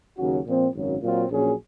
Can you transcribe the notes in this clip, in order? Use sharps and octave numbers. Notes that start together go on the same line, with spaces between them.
D#2 C#3 F#3 C#4 F#4
A#2 F3 C4
G#1 F#2 C#3 F#3
A#2 F#3 C4 F4
A#1 A#2 F#3 C#4 G#4